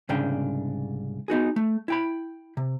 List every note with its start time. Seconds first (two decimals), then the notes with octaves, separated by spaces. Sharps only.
0.09 C2 G#2 C#3 D4 G5
1.28 B3 D#4 F#4 G#4
1.56 A3
1.88 E4 G5 B5
2.57 C3